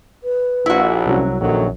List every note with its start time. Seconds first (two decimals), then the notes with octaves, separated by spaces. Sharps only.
0.24 B4
0.66 A#1 E4 F#4
1.07 C2 F#3 C#4
1.41 A#1 F#2 D#3 F#3 A4